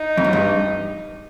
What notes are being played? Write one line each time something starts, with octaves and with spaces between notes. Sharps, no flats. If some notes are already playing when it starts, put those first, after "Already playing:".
Already playing: D#4
F2
F#2
G2